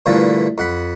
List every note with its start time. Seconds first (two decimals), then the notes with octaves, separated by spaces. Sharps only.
0.06 G2 A#2 D3 E3 F3 A3
0.58 F2 F#5 B5